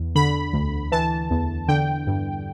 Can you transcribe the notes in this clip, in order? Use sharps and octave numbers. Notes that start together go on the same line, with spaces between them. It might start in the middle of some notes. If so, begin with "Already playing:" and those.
Already playing: E2
D3 B5
D2
E3 A5
E2
D3 G5
G2